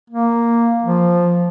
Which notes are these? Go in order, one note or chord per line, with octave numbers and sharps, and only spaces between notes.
A#3
F3